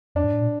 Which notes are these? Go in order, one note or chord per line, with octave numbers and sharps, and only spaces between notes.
F2 D4
G#2
A2
A#2